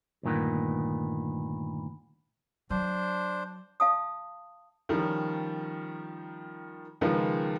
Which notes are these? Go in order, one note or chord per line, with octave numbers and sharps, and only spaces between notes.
D2 G2 A#2 D#3 B3
F#3 D4 C5
F5 A5 D#6
D#3 F3 G3 C#4
C#2 D#3 F3 G#3 F4 B4